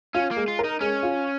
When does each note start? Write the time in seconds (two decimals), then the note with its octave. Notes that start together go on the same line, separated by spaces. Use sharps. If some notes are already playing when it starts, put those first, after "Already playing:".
0.14 C#4 F4
0.31 A#3
0.36 G#3
0.48 F4
0.59 A#4
0.64 D#4
0.81 G#3 C#4
1.03 F4